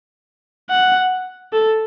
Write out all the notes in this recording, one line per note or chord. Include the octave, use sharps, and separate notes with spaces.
F#5
A4